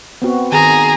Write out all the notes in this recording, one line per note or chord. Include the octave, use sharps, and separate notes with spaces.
B3 C4 F#4
D#3 G#4 A#5